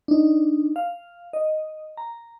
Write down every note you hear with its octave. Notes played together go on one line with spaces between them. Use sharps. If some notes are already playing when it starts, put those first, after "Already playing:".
D4 D#4
F5
D#5
A#5